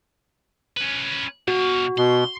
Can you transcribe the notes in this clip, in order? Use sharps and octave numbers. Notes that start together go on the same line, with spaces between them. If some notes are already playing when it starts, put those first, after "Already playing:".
C#4 B4
B2 F#4 F5
B2 C6